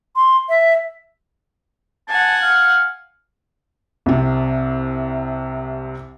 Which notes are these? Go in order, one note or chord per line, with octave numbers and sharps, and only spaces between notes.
C6
E5
F#5 G#5 A5
F5
C2 C3